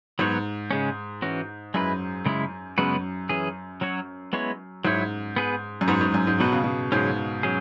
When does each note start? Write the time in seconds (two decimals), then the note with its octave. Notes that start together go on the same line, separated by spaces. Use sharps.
0.19 G#2 F#3 B3 F#4 C#5
0.71 C#3 G#3 C#4
1.22 E3 C#4 F#4
1.74 F#2 G#3 E4 B4
2.26 C#3 G#3 E4
2.78 F#2 C#3 G#3 B3 F#4 B4
3.29 E3 C#4 G#4
3.81 F#3 C#4 F#4 C#5
4.33 G#3 B3 E4 C#5
4.84 G#2 F#3 E4 C#5
5.36 B3 G#4 B4
5.81 F#2
5.88 G#2 B3 F#4 C#5
6.01 G#2
6.14 F#2
6.27 G#2
6.40 B2 F#3 B3 F#4 B4
6.52 C#3
6.64 B2
6.92 G#2 C#3 F#3 C#4
7.43 F#3 C#4 G#4